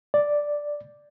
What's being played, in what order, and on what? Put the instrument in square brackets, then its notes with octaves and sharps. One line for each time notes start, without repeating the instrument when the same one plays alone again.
[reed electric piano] D5